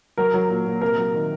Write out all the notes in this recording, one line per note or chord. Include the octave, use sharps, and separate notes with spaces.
F#3 A#4
F#3
A#2
A#2
C3 A#4
F#3
D#3